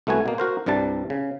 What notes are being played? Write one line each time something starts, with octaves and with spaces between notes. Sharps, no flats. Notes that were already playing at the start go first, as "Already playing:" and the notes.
C2 A3 B3 F#4 G#5
B2 A#3
F#4 A#4 C5
C2 G2 C3 G3 A5
C#3